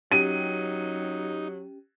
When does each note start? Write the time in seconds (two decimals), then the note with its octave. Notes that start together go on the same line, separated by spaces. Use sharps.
0.12 F#3 C#4 D#4 G4 D#7